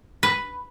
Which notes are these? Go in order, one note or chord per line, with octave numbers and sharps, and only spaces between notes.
B4